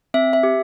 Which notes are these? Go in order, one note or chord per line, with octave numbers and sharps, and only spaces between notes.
C4 E5
E5
G4